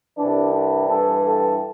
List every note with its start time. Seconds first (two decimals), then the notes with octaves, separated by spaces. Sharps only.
0.17 C2 C3 E3 D4
0.53 D4
0.87 G2 E3 A4
1.21 A4